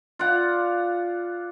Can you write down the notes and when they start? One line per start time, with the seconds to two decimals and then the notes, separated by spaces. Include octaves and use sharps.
0.19 F4 D5 F#5